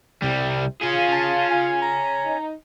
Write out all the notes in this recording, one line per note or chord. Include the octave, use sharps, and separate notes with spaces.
C2 C3 G3
C#4 F4 G#4
A5
G#5
A#5
D#4